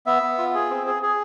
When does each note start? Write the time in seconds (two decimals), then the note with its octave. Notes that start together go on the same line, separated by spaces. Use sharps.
0.06 B3 E5
0.22 B3
0.38 F4
0.54 G#4
0.70 C4
0.87 G#4
1.03 G#4